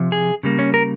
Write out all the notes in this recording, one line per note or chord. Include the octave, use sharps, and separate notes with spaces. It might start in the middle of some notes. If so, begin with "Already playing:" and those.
Already playing: C3 F3
G#4
C#3 G3 A#3
C#4
A#4